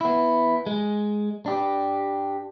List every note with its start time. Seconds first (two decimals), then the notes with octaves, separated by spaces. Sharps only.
0.01 B3 E4
0.66 G#3
1.46 D4 G4